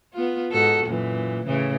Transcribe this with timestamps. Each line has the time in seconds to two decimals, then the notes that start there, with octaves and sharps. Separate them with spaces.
0.13 B3 F4
0.51 G#2 F#4 A4
0.85 F#2 A#2 E3
1.45 A2 C#3 E3